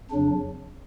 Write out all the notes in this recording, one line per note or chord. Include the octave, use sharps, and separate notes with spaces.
F2 C#3 F#3 D4